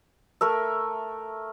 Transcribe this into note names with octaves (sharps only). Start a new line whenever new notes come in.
A3 A#4 E5